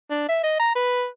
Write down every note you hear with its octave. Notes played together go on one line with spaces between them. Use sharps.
D4
E5
D#5
A#5
B4